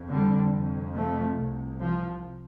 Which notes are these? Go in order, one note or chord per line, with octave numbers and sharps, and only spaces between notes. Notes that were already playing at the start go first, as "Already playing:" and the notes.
Already playing: F2 C3
D3 G3
F2 C3
F3 A3
C2 C3
F3